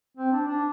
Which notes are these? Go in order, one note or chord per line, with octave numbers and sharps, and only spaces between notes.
C4
D4
D4